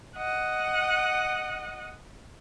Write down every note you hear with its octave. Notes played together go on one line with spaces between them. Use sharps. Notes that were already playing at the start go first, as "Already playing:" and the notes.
D#5 F#5